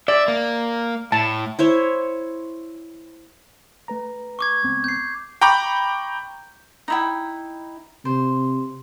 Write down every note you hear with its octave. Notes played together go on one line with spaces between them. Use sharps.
D5 E5
A#3
A2 A5
E4 C5 C#5
A3 B4 A#5
C#6 D6 G#6
C#2 B3 C4
G6 C7
G5 A#5 B5 C#6 D6 G6
D#4 E4 G5
C3 C5